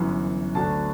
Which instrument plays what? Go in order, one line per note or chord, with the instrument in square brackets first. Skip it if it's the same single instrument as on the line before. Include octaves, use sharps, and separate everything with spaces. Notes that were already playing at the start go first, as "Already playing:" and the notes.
Already playing: [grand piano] G1 F#2 E3
D2 D3 F#3 A5